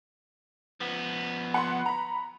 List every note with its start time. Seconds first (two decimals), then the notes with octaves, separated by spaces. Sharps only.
0.80 F3 B3
1.54 F#5 B5 C6
1.86 A#5 B5